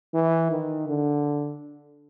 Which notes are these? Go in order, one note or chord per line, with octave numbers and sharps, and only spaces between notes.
E3
D#3
D3